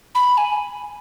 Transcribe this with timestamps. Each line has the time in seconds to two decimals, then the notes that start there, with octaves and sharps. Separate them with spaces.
0.15 B5
0.38 G#5